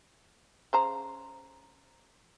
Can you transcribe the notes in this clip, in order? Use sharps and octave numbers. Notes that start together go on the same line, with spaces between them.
C#3 C5 A#5